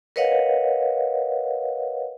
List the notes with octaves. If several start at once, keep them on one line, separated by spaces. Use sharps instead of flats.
A#4 B4 C#5 D#5 F5 F#5